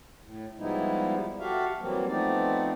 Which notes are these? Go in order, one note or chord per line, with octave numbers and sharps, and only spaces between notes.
A2
F3 G3 G#3 B3 D#4 E4
F#4 G4 A4 E5 F5
E3 F#3 G3 A#3 C4
F3 A3 B3 C4 D#4 D5